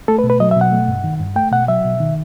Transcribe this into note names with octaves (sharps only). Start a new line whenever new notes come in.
A3 A4
B4
B2
B4
F#3 D#5
E5
B2 F#5
A3
G2
D#3
G2
A3 G5
B2 F#5
F#3 E5
B2
D#3